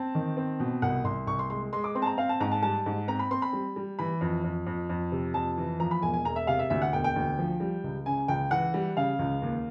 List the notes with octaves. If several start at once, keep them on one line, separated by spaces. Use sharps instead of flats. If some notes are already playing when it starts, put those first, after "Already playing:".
Already playing: C4 A5
D#3
C4
B2
C2 F#5
C2 C6
C2 C#6
C6
G#3 C6
G#3 C6
D6
C4 C6
A5
A#5
C4 F5
A5
G#2 A#5
A5
G3 A5
G#2
C4 A#5
B5
C4 C6
B5
G3
G3
E3 B5
F2
F2
F2
F2
C3
F2 A5
E3
F3 A#5
B5
E1 G#5
G#5
E1 A#5
E5
C3 F5
E5
D2 E5
F#5
E1 G5
G5
D2
F3
G3
C#2
C#3 G#5
C#2 G5
E3 F#5
G3
C#3 F5
C#2
D#2